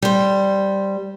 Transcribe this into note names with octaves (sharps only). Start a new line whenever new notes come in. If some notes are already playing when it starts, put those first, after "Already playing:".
G3 C5